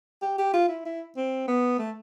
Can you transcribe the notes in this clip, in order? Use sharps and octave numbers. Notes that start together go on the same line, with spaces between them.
G4
G4
F4
E4
E4
C4
B3
A3